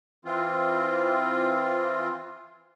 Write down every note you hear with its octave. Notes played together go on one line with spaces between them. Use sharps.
E3 C4 F4